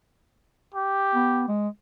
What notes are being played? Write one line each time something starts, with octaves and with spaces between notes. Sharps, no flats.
G4
B3
G#3